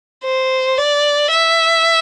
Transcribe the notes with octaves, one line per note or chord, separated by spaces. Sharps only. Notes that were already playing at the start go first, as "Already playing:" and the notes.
C5
D5
E5